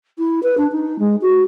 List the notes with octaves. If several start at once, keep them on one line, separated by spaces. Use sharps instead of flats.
E4
B4
D4
D#4
G#3
F#4